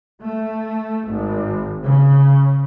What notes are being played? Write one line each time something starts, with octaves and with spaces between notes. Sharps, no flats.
A3
G#1
C#3